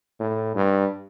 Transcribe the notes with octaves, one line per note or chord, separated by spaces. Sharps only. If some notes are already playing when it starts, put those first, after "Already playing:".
A2
G2